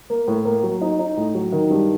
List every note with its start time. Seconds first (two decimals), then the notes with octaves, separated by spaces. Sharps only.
0.10 A#3
0.28 A2
0.45 A#3
0.63 F#3
0.81 D#4
0.99 D#4
1.17 A2
1.34 F#3
1.52 D#3
1.70 G2